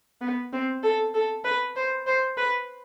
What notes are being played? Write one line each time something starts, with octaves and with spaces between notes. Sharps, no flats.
B3
C4
A4
A4
B4
C5
C5
B4